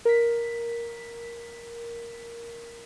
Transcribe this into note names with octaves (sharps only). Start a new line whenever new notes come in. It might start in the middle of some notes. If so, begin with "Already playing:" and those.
A#4 B6